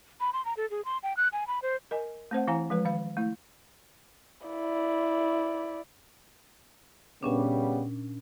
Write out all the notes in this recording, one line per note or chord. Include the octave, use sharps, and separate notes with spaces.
B5
C6
A#5
A4
G#4
C6
G5
F#6
G#5
B5
C5
A#4 D#5 G#5
A3 C4 C5 F#5
E3 E4 F5 G#5 A#5
F3 G#3 B4
D#3 F5
A3 E4
E4 D5
A#2 C#3 G3 B3 C#4 D4